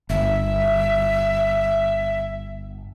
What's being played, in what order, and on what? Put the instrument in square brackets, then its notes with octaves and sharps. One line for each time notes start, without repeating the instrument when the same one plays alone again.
[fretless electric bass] G1 [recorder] E5